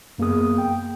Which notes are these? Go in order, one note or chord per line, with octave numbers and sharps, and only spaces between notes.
F#2 A#3 B3 G#4 D#6
G5